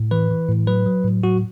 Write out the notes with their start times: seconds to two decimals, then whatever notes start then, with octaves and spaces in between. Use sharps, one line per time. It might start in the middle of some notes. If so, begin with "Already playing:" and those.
Already playing: A2
0.11 E3 B4
0.30 E3
0.49 A2
0.67 F#3 B4
0.86 F#3
1.05 A2
1.23 F#3 F#4